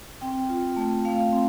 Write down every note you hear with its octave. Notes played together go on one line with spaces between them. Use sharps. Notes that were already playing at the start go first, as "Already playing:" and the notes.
C4 G5
F4
A3
A3 F5
C4